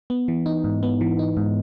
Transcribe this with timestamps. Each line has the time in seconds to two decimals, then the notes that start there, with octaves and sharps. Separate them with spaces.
0.10 B3
0.28 E3
0.46 D#4
0.64 G#2
0.83 B3
1.01 E3
1.19 D#4
1.37 G#2